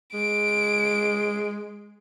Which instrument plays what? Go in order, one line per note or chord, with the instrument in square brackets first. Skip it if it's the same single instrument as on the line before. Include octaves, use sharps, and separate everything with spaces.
[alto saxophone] G#3 [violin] D7